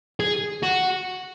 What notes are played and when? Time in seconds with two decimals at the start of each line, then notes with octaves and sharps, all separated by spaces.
0.20 G#4
0.63 F#4